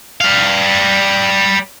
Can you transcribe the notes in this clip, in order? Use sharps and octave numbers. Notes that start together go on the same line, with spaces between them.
G3 F5